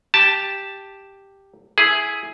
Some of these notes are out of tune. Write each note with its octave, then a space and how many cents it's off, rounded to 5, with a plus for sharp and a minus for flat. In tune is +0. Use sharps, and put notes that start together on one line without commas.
G4 +0 A5 +0
E4 +0 G#4 +5